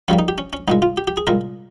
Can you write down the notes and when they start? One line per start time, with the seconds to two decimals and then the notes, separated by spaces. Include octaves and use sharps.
0.08 F2 C#3 G3 A#3 C#4
0.19 D#4
0.28 G4
0.38 C#4
0.53 C#4
0.68 C2 A#2 G#3 D#4
0.82 F4
0.97 G4
1.08 G4
1.17 G#4
1.27 C2 A#2 G#3 A#4